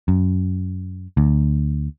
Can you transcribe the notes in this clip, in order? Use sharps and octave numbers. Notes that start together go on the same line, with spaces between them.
F#2
D2